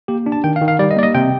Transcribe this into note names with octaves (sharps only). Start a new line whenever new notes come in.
A#3 G4
D4
A5
D#3 G5
F5
D#3
F5
G3 D5
D#5
A#3 D5
D#5
C3 G5